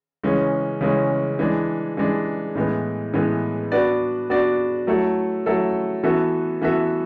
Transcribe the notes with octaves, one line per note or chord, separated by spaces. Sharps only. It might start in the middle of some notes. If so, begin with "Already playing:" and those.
C#3 E3 G#3 C#4
C#3 E3 G#3 C#4
E3 G#3 D4
E3 G#3 D4
A2 E3 G#3 B3
A2 E3 G#3 B3
B3 D4 F#4 B4 D5
B3 D4 F#4 B4 D5
F#3 A3 E4 A4
F#3 A3 E4 A4
E3 B3 F#4 A4 E5
E3 B3 F#4 A4 E5